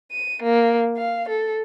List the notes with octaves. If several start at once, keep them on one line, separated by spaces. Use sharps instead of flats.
D#7
A#3
F5
A4